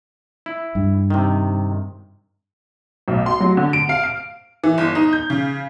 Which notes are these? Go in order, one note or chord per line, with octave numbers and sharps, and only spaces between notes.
E4
G2
C3 D#3
B1
C6
F#3
D3
D7
F5
D7
E3
G1
D#4
G6
C#3